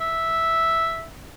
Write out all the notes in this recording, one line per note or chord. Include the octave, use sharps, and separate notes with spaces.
E5